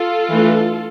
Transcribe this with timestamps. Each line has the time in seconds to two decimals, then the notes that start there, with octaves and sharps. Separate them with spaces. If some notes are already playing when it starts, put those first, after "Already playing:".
Already playing: F4 A4
0.31 E3 A3 D4